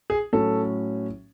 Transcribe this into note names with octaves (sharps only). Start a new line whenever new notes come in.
G#4
A2 F#3 C#4 A4